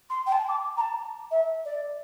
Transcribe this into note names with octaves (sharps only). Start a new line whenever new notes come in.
C6
G5
A5
D6
A#5
A5
E5
D5